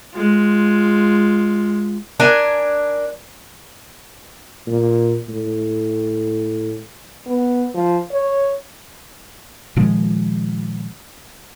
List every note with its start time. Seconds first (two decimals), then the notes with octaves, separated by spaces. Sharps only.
0.13 G#3 F4
2.20 D4 A#4 G#5
4.67 A#2
5.29 A2
7.27 B3
7.75 F3
8.11 C#5
9.76 A#2 D#3 F3 G#3